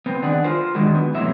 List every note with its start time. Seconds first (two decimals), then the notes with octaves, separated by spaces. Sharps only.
0.06 B3 C4
0.22 D#3 D4 G#4 F#5
0.44 F4 A#4 C5
0.75 D#3 G#3 D4 F#4
0.95 B3
1.14 A2 C3 E3 F#3 A3 E5